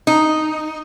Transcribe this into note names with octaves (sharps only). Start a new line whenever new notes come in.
D#4